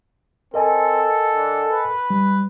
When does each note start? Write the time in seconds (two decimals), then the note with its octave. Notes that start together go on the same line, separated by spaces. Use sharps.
0.54 C4 A4 A#4 D#5 G#5
1.33 D3
1.72 B4
2.10 G3